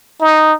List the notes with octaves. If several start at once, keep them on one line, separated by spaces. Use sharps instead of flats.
D#4